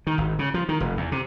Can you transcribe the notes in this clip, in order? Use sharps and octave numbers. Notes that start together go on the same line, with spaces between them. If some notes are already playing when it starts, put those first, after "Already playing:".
D#3
G#1
C#3
F3
D#3
F1
E2
C3